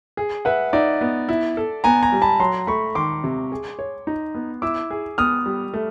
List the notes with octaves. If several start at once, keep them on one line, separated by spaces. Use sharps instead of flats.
G#4
B4 E5 F#5
D#4 D5 E5
B3
E4
A4
B3 G#5 A#5
G#5 A#5
G3
A5 B5
F#3 A#5 C6
A3 B5 C#6
D#3 C6 D6
C3
G#4
C#5
D#4
B3
E4 D6 E6
G#4
B3 D#6 F6
G3
A3